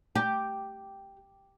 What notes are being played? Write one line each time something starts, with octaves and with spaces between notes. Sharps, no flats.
G4